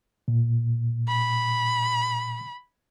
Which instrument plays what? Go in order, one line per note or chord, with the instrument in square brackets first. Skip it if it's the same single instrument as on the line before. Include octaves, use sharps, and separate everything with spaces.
[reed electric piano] A#2
[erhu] B5